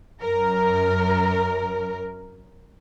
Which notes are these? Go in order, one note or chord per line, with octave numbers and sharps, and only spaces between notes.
F#2 A#4